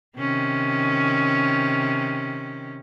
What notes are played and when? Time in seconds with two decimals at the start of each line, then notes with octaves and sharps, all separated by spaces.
0.18 C3 D#3 C#4